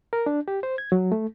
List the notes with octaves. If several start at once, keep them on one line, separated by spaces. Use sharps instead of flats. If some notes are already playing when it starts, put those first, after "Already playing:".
A#4
D4
G4
C5
G#6
F#3
A3